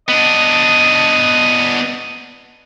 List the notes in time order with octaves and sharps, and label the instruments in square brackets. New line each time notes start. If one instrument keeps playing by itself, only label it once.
[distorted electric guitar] B3 D4 [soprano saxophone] D#5